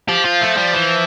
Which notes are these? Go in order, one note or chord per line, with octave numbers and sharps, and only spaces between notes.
F3 G4
F4
A3
G3
E3